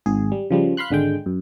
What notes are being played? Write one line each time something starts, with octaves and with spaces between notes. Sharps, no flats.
G#1 G#4
G3
C#3 F3 G3
F5 B5 C6 F#6
G#1 D3 G#3 G5
F#2